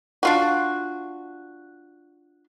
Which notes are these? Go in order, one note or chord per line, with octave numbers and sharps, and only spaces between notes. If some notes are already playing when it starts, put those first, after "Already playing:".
D4 F4 F#4